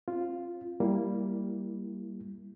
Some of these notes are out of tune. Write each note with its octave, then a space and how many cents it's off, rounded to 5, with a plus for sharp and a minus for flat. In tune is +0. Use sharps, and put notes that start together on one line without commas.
C4 +35 F4 +0
G3 +0 A#3 +0 E4 +0